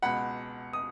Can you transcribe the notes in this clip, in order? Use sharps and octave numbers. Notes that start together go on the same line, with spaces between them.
C#2 B2 F#5 B5
D#6